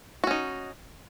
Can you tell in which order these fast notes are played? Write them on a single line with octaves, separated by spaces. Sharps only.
F#4 C#4 D#4